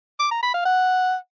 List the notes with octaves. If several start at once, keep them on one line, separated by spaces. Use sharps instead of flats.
D6
A#5
B5
F5
F#5